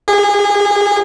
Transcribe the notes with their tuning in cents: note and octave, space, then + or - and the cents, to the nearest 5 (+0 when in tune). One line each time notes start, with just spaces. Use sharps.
G#4 -30